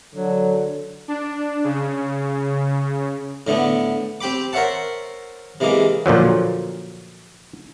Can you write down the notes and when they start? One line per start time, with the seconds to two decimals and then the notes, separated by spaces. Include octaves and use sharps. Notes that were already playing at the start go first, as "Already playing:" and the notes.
0.15 D3 F#3
1.08 D4
1.64 C#3
3.47 A2 D3 A3 B3
4.21 C4 G4 G5 B5 D6
4.53 A#4 C5 C#5 E5 F#5 A5
5.60 C3 E3 G#3 A#3 D6
6.06 A#2 D3 F3 F#3